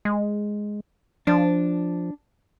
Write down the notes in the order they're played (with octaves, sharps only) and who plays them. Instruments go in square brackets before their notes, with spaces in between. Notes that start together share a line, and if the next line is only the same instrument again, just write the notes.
[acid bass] G#3
[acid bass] F3 [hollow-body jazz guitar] D4